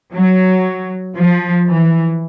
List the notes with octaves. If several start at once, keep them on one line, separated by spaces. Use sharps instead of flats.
F#3
F3
E3